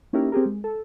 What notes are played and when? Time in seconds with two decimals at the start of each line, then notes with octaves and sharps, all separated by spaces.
0.13 A#3 C#4 D#4 E4 G4 A#4
0.32 C4 G4 G#4 A#4
0.45 G#3
0.64 A4